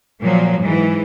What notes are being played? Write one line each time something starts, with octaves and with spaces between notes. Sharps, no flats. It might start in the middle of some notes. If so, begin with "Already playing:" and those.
A#2 F3 F#3 A#3
G#2 E3